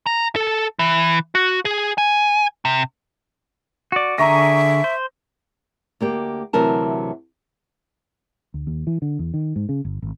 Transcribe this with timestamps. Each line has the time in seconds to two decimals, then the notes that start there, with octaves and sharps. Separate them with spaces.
0.06 A#5
0.36 A4
0.79 E3
1.35 F#4
1.65 G#4
1.98 G#5
2.65 C3
3.92 F#4 D5
4.18 D3 G#4 E5 A#5 C#6 A#6
4.84 C5
6.01 D2 A#3 G4
6.53 D2 C3 E3 F#3 A#4 A5
8.54 D2
8.67 D#2
8.87 E3
9.02 D3
9.19 E2
9.34 D#3
9.56 G#2
9.69 C#3
9.85 G1
10.02 G#1